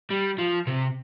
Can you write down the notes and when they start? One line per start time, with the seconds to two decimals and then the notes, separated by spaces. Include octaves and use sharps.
0.10 G3
0.38 F3
0.67 C3